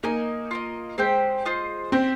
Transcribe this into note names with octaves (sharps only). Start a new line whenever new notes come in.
A#3 D#4 A#4 D#5 G#5
F4 A#4 D#5
G#3 C4 G4 C5 G5
F4 C5 D#5
C4 G4 C5 G5